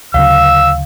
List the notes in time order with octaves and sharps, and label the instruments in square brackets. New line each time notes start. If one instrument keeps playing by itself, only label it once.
[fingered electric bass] D2 C#3 F#3 [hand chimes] F5 [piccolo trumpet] E6